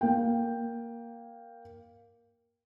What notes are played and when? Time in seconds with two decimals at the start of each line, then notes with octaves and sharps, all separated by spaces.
0.01 A#3 G5